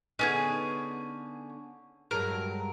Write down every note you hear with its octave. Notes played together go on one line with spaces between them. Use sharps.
D3 B3 C#4 D#4 F4 G#4
G2 F#3 G#3 A#4